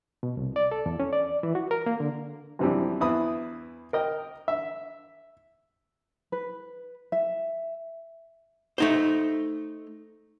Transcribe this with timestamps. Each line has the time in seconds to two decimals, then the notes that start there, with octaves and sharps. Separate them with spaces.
0.23 B2
0.37 C2
0.56 D5
0.71 A4
0.86 E2
1.00 C#4
1.13 D5
1.43 E3
1.55 F#4
1.71 A#4
1.86 A#3
2.00 D3
2.59 F#2 C3 E3 F3 G3
3.01 E2 E4 B4 D#6
3.93 A#4 D#5 G5
4.48 E5
6.32 B4
7.12 E5
8.78 A3 D#4 C5